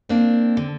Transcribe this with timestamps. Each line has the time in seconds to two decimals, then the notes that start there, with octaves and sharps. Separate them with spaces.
0.09 A#3 C4 D4
0.57 D3